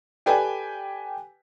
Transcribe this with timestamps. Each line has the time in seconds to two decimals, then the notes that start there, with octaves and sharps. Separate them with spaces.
0.26 G4 A4 B4 D5 G5 G#5